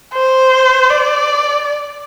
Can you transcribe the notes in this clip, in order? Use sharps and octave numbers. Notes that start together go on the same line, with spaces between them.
C5
D5